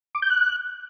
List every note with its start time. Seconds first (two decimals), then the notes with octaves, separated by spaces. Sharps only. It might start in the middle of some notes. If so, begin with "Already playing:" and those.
0.15 D6
0.22 G6
0.30 F#6